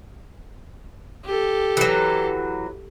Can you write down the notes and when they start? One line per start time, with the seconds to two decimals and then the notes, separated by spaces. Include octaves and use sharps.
1.25 G4 A4
1.77 E3 F#3